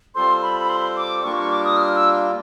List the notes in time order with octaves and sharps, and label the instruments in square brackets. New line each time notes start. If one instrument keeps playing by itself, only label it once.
[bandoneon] G3 C4 F4 A4 C5 [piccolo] C6
[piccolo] B5
B5
C6
D6
[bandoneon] G3 A#3 D4 F4 [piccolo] C#6
[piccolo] C#6
D6
D#6
F6
E6